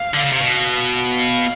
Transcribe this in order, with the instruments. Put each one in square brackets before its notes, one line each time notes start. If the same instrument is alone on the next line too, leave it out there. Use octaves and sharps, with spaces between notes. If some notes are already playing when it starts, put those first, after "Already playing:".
Already playing: [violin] F5
[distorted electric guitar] D3
C#3
C3
B2
[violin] F5